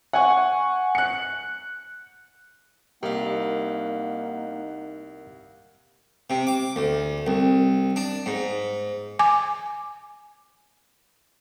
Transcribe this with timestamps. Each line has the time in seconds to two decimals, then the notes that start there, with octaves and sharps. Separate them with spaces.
0.13 F#5 G#5 C#6
0.95 F#6 C#7
3.03 C2 A#3 D#4 G4 A#4 D#5 F5 F#5
6.30 C3
6.47 D6
6.76 D2
7.27 C2
7.96 D4
8.26 G#2
9.19 G#5 D6